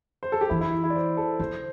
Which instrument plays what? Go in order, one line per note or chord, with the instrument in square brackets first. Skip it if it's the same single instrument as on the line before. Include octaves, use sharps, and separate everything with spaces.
[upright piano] C5
A4
G4
[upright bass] E3 [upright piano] E4
[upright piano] E4
E4
D5
C5
A4
[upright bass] D3 [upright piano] C5